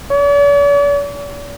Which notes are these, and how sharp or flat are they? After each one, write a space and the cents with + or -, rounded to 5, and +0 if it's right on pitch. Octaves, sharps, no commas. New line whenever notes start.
D5 -45